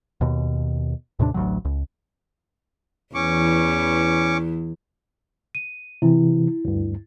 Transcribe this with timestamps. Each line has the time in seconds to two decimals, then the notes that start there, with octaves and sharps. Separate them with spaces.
0.21 D#2 B2
1.19 D#2 A2 C3 D4
1.34 A1 D2 B2 F#3
1.65 C#2
3.15 E2 E3 C#4 C#6 D6
5.55 D#7
6.02 C3 E3 E4
6.65 D2 G2